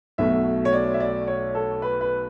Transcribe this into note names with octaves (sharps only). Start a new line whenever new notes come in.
B1 B2 A3 E5
C#5
D5
E5
D5
C#5
A4
B4
B4